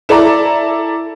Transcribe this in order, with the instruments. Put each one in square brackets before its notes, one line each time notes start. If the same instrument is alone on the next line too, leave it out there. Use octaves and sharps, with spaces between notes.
[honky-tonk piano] E4 A4 D5 A#5